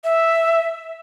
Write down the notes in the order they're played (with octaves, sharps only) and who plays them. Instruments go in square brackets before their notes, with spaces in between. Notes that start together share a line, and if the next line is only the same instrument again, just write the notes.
[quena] E5